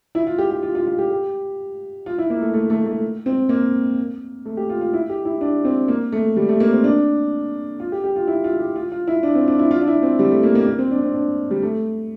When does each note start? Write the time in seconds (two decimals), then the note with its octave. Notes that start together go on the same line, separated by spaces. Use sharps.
0.15 E4
0.27 F4
0.38 G4
0.51 G4
0.63 F4
0.75 F4
0.87 F4
0.98 G4
1.10 G4
2.06 F4
2.18 E4
2.30 A#3
2.41 A3
2.54 A3
2.70 A3
2.86 A3
3.26 C4
3.49 A#3
4.45 A3
4.57 G4
4.70 F4
4.81 F4
4.93 E4
5.09 G4
5.25 E4
5.41 D4
5.65 C4
5.88 A#3
6.12 A3
6.37 G3
6.49 A3
6.60 A#3
6.72 C4
6.84 D4
7.80 F4
7.92 G4
8.04 G4
8.16 F4
8.27 E4
8.44 F4
8.59 G4
8.76 F4
8.92 F4
9.07 E4
9.23 D4
9.35 C4
9.48 D4
9.59 E4
9.71 F4
9.81 D4
9.88 E4
10.03 C4
10.19 G3
10.31 A3
10.43 A#3
10.55 A#3
10.67 A#3
10.79 C4
10.91 D4
11.03 C4
11.14 D4
11.51 G3
11.63 A3